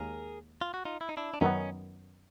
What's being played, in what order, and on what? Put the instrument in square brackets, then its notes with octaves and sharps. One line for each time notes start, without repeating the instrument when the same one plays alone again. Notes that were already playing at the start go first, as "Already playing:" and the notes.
Already playing: [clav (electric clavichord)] D#2 G#3 [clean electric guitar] G#4 A#4
[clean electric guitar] F4
F#4
D#4 F4
E4
D#4
D4 E4
D4
[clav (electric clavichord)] F#2 D#3 F#3 B3 [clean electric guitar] C#4 D#4